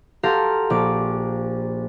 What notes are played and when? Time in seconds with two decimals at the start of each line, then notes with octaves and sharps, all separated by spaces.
0.23 F#4 G4 A4 F5 A#5 C6
0.70 A#1 D6